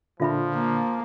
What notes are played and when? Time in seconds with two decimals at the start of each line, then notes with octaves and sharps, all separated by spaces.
0.20 A#2 D3 F3 D4 F4 E5 B5
0.54 A#3